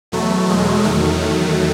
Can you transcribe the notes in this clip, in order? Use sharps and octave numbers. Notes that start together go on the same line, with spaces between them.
E2 B2 F#3 A3
G#3
E2 D#3 F#3 A3